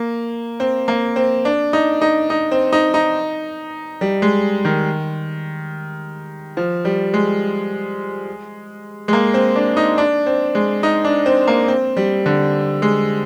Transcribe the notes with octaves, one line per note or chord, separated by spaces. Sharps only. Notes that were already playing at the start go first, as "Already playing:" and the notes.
Already playing: A#3
C4
A#3
C4
D4
D#4
D#4
D#4
C4
D#4
D#4
G3
G#3
D#3
F3
G3
G#3
G#3
A#3
C4
D4
D#4
D4
C4
G#3
D#4
D4
C4
A#3
C4
G3
D3
G#3